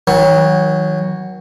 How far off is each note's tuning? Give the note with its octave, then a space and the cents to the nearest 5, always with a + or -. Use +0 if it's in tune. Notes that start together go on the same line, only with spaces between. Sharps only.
D#3 +45 F#3 +0